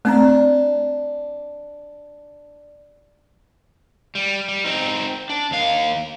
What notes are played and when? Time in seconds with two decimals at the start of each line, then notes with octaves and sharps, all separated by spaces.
0.05 A3 C4 D4 A#5
4.15 G3
4.48 G3
4.65 C4 D#4
5.29 D4
5.51 D#2 F5